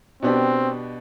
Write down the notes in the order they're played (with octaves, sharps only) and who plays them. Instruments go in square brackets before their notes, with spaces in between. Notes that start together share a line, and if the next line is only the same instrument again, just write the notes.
[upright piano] B2 B3 D4 G4 [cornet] C4